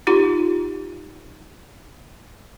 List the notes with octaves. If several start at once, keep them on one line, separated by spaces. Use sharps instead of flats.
D#4 F4 G4